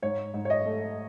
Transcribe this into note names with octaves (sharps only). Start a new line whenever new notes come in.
G#2 C#5
G#2
C#5
D#5
A3